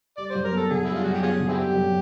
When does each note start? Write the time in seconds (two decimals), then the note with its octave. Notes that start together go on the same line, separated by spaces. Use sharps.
0.17 G3 D5
0.30 F#2 C5
0.44 A#4
0.52 B3 A4
0.70 D3 G#4
0.85 G3 E4
0.95 F4
1.04 F#2 F#4
1.13 G4
1.23 B3 C#4 F4 G#4
1.40 D3
1.49 C4 E4 G4
1.57 G3
1.76 F#2